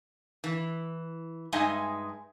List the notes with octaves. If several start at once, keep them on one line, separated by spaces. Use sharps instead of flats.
E3
G2 G#3 D#4 D#5 E5 G#5